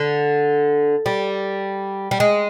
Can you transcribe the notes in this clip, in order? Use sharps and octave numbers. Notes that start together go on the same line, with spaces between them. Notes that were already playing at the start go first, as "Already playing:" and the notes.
Already playing: D3
G3
G3
G#3